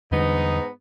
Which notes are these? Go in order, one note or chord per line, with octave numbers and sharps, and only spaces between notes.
E2 G#2 D3 G3 B3 D#4